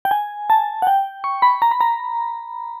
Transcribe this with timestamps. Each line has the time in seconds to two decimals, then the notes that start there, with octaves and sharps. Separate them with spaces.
0.05 G5
0.11 G#5
0.50 A5
0.82 F#5
0.87 G5
1.24 C#6
1.42 B5
1.62 A#5
1.71 B5
1.81 A#5